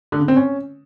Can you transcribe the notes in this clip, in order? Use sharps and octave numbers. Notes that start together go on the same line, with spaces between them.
D3
C#3
C4
C#4